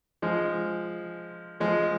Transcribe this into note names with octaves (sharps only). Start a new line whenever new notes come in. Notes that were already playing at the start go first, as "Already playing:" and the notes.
F3 G#3
F3 G#3